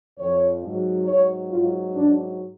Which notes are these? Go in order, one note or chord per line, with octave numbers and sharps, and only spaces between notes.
F2 F3 C#5
G#2 F#3
G#2 F#3 C#5
G#2 F#3 F4
G#2 F#3 D4